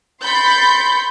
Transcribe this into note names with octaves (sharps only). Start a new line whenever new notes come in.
B5 C6 G6 A6 B6 C#7